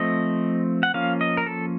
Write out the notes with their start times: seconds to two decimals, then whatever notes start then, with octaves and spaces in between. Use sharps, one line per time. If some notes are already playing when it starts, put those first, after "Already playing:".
Already playing: F3 A3 C4 D#5
0.83 F#5
0.94 F3 A#3 C#4 F5
1.21 D#5
1.37 A#4
1.46 A4